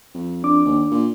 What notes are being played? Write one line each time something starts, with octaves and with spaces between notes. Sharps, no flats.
F2
D4 D6
D#2
A#2